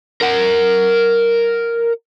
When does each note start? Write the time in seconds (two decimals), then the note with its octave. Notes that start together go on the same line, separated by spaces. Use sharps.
0.22 A#4 F#5